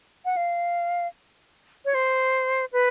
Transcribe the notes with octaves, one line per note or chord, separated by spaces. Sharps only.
F#5
F5
C#5
C5
B4